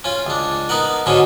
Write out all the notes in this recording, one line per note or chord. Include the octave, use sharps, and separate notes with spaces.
C#4 F4
C#2 D4
B3 D#4 A#4 F#5
G#2 B2 D3 G#3 C#4 C#6